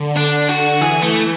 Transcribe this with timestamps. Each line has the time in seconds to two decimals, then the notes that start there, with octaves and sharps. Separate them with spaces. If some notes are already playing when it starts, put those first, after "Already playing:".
Already playing: D3
0.17 D4
0.49 F#4
0.81 E3 G#4
1.02 A3